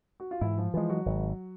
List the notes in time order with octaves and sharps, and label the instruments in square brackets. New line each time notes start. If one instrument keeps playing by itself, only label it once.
[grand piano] F#4
F4
[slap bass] G#2 [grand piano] E3 E4
[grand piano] F3 F4
[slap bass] E3 G#3 [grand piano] F3 F4
[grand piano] F#3 F#4
[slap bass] G#1